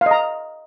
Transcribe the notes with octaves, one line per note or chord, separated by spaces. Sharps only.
D#5 F5 A#5